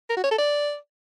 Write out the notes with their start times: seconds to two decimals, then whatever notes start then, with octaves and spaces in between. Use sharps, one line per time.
0.09 A#4
0.17 F#4
0.24 C#5
0.31 A4
0.38 D5